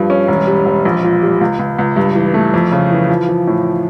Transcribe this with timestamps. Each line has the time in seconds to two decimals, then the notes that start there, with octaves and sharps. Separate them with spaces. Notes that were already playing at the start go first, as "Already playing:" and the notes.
Already playing: G2 F3
0.10 C#4
0.28 E1
0.47 G3
0.66 E1
0.85 A#1
1.04 A#2
1.22 G3
1.41 C#2
1.59 C#2
1.79 C#2
1.96 G2
2.15 E3
2.34 A3
2.54 F2
2.72 C#3
2.91 E3
3.09 F3
3.29 F3
3.47 A2